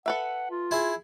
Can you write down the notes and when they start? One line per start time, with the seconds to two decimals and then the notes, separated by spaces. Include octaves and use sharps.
0.06 A4 B4 E5 F#5
0.51 F4
0.71 E4 G#4